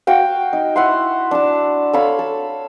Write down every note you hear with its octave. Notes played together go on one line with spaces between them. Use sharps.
F#4 F5 G5
D#4
E4 F#5 C6
D4 A5
A4 C#5 F5 B5
A4